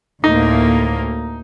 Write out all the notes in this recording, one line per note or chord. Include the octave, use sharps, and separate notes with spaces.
D2 A2 A#3 D#4